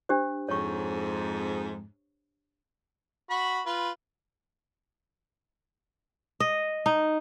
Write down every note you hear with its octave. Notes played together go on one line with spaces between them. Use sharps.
D4 G4 C5
F2 G#2 C#5 C#6
F#4 B5 C#6
F4 B4
D#5
D#4